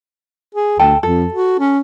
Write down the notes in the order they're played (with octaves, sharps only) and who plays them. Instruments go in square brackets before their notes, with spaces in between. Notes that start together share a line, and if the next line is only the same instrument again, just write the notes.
[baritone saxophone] G#4
[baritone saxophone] D2 [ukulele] A4 G5 A5
[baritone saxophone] F2 [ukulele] A4
[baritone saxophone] F#4
C#4